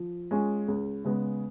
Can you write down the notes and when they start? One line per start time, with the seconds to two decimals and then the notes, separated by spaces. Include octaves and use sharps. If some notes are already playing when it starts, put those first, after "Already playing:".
Already playing: F3
0.31 G#3 C#4 F4 G#4
0.68 C#2
1.05 C#3 G#3 B3